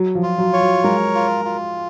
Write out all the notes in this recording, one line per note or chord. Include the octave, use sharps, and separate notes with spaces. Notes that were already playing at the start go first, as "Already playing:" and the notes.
Already playing: F#3
F3
F4
F#3
C#5
F#3
G#3 A#4
F4
F4